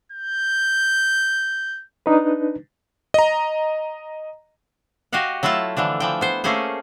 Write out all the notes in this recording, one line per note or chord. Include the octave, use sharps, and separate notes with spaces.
G6
D4 D#4 B4
D#5 A#5
F#4 G4 D#5 F5 F#5
F#3 A3 E4 F4 A5
D3 E3 F3 D4
E3 F3 G5
B3 C5
A3 A#3 C#4 G#4 C5